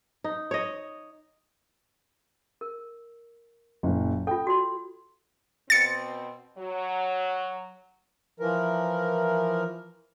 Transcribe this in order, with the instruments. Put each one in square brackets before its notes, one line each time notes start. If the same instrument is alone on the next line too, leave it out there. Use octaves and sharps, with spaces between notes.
[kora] D#4
C#5 D#5
[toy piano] A#4
[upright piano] F#1 A#2
[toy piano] F4 A4 [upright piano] G5
[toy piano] F#4 D5 C6
[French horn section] B2 C4 [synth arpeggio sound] A6 C#7
[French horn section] F#3
[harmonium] E3 F3 A#4